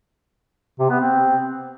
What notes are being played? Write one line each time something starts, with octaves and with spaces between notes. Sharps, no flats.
C3
B3
C4